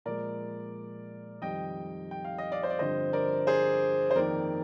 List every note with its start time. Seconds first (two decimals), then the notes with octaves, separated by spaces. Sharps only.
0.05 A#2 F3 G#3 A#4 D5
1.42 F2 D#3 G3 D#5 G5
2.11 G5
2.25 F5
2.38 D#5
2.52 D5 F5
2.63 C5
2.70 D5
2.79 G2 D3 F3 C4 C5 D#5
3.13 A#4 D5
3.47 G#4 C5
4.11 C5
4.15 F2 D#3 A#3 D#4 A#4 D5